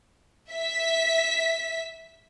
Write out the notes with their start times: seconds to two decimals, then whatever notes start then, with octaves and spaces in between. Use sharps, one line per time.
0.51 E5 B6